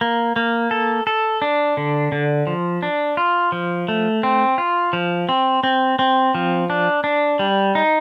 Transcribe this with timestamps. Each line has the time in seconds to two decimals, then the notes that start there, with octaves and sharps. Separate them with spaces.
0.01 A#3
0.36 A#3
0.71 A4
1.07 A4
1.42 D4
1.77 D3
2.12 D3
2.47 F3
2.83 D4
3.17 F4
3.52 F3
3.88 A3
4.23 C4
4.58 F4
4.93 F3
5.29 C4
5.63 C4
5.99 C4
6.35 F3
6.70 D4
7.04 D4
7.39 G3
7.75 D#4